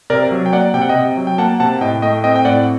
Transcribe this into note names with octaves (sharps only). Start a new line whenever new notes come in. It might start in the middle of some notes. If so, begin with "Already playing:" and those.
C3 A#4 D5
F#3
G5
A#3 D5 F#5
C3 G5
F#5
D#5 G5
C3
F#3
G5
A#3 F#5 A5
C3 F#5 A5
A2 D#5 G5
A3 D#5 G5
C4 D#5 G5
G5
A2 D5 F#5